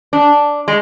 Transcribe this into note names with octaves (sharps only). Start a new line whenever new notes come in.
D4
G#3